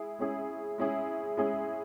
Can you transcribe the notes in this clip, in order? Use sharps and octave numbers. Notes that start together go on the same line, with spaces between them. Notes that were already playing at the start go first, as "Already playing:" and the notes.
Already playing: G#3 E4 G#4
G#3 C#4 E4 G#4
G#3 C#4 E4 G#4
G#3 C#4 E4 G#4